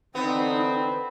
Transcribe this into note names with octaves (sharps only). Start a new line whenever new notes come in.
D3 E3 B3 C4 D#4